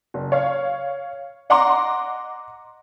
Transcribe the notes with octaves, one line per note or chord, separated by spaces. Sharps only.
F#1
C#5 F5
D#5 F#5 A#5 C6 D6